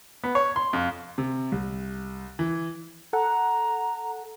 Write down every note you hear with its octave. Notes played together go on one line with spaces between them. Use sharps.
B3
C#5
C6
F2
C3
C2
E3
A4 F#5 A#5